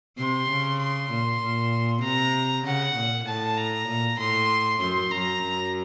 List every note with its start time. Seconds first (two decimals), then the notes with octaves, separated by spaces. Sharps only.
0.18 C3 C6
0.49 C#3
0.79 C6
1.10 A#2
1.41 A#2
2.03 C3 A#5
2.65 C#3 F#5
2.96 A#2
3.26 A2 A5
3.57 A#5
3.88 A#2
4.19 A2 C6
4.80 F#2 C6
5.11 F#2 A#5
5.43 F#2